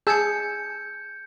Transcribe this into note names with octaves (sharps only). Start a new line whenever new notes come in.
G#4 A5 E6 G6 G#6 C#7